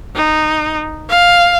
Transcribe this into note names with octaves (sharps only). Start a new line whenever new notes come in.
D#4
F5